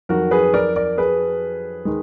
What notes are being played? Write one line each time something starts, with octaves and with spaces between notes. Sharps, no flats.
F2 D#3 F#3 F#4 A#4
G#4 B4
A#4 D5
A#4 D5
G#4 B4
D#3 G#3